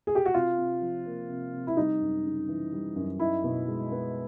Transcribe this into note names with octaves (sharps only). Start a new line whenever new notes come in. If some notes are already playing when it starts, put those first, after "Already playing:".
G#4
G4
F#4
C3 F4
C3
F3
A#3
C3
C3
E4
G3 D#4
F#2
C#3
E3
G3
F#2
D#4 E4
B2
G#3
B3